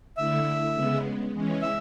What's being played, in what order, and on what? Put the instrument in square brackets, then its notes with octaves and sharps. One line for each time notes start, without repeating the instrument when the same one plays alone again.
[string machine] D3 A3 E4 [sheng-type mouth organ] E5
[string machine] C#3 G#3 B3
E3 G#3 C#4
[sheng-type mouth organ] E5